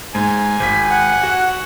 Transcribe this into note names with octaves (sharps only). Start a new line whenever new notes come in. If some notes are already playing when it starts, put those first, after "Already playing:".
G#2 G#5
G#1 B6
F#5
F#4